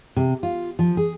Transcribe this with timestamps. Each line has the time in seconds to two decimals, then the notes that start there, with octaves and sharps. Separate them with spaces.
0.16 C3
0.43 F4
0.79 F3
0.97 G#4